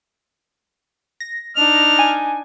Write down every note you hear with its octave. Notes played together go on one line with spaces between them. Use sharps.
A#6
D4 D#4 F6
G#5